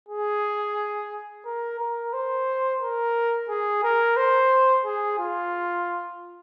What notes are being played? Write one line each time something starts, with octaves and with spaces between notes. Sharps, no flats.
G#4
A#4
A#4
C5
A#4
G#4
A#4
C5
G#4
F4